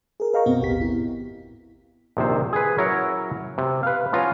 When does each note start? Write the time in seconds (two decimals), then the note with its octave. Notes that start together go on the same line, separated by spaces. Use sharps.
0.20 G#4 A#4
0.34 A#4 D#5 F5 G5 A#5 C#6
0.46 F#2 B2 B3 C4 F#4
0.61 A1 D#2 G4 B6
0.79 G#1 E4
2.17 A#1 C3 D#3 C5
2.53 G#4 B4
2.78 F#3 C#4 E4 A#4 C#5
3.58 C3
3.83 B4 F5
4.12 F3 B3 C#4 F4 G#5 A#5